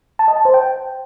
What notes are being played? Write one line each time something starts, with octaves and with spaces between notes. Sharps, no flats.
A5
D#5
A5
C5
G5